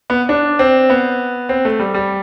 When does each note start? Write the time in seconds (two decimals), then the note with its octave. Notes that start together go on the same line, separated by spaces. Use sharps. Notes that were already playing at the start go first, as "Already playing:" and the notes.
0.10 B3
0.29 D4
0.59 C4
0.90 B3
1.49 C4
1.65 A3
1.79 G3
1.94 G3